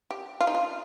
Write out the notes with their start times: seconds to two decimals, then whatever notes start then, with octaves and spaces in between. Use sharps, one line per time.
0.11 G4
0.41 F4
0.47 D#4
0.55 F4